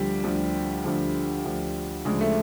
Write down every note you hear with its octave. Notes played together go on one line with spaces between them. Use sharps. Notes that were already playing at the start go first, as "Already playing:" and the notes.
Already playing: D2 D3 F3 G3
D2 D3 F3
D2 D3 F3
D2 D3 F3
D2 C#3 F3 G#3
A3